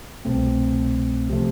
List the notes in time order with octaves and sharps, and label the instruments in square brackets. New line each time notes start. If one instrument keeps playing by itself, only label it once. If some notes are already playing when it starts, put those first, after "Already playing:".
[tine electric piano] C2 B2 A3 C4
C3 F3 A3